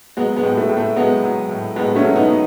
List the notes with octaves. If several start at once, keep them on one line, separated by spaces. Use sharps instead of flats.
F#3 G#3 B3
G#3 B3
A2
A3
A2
A3
F#3 G#3 B3
F#3
A2
A2 G#3 B3
A3 C#4
F#3
B3 D#4
F#3